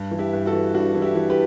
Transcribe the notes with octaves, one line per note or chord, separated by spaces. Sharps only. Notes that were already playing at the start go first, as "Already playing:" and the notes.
Already playing: G2
E3
E4 G4
G2
F#4 A4
E3
G2 D4 F#4
E3
E4 G4
E3
G4 B4